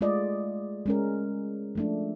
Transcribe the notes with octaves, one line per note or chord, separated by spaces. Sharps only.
G#3 A3 F4 D5 D#5
G#3 C#4 A#4
F3 A3 D4